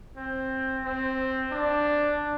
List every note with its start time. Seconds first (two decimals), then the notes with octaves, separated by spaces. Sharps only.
0.17 C4
0.85 C4
1.51 D4